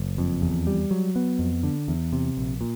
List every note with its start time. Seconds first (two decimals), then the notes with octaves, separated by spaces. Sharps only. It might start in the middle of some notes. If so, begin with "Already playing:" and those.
Already playing: F#1
0.18 F2
0.42 E2
0.67 G3
0.91 F#3
1.16 B3
1.39 F2
1.63 D3
1.88 E2
2.13 C3
2.37 A#1
2.61 A#2